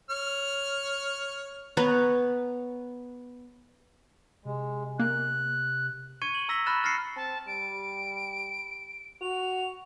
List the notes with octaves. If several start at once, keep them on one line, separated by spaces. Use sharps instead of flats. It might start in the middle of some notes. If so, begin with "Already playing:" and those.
C#5 F6
B3 B4 C#5 A#5
C3 G#3
A#3 F#6
C#6 G#6 C#7 D#7
F#7 G7
A#5 E6 A#6 B6 D#7 G7
B5 C#6 F6 F#6 A6 E7
F6 A6 A#6 C7 C#7
C4 A5
G3 D7
F#4 F7